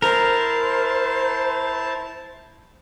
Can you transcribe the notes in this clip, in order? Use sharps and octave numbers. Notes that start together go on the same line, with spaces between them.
E4 A#4 C5 A5